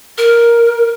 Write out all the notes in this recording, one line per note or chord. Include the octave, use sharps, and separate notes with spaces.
A#4